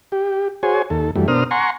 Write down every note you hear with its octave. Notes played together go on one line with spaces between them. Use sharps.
G4
F#4 G#4 C5 C#5 G#5
D#2 A4
F#2 E3 G3 A3
B2 D4 A#4 C5 D#6 F6
F#5 G#5 A#5 C6 C#6